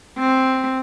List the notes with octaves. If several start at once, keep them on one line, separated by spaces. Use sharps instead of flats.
C4